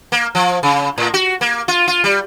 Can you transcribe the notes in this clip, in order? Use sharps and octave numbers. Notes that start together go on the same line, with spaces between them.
A#3
F3
C#3
A2
F#4
A#3
F4
F4
G3